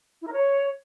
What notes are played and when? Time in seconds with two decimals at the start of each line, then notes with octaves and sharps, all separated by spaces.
0.21 E4
0.27 A#4
0.32 C#5